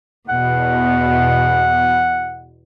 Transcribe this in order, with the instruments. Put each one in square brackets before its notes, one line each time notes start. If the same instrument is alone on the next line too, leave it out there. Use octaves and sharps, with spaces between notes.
[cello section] E2 B2 [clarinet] F#5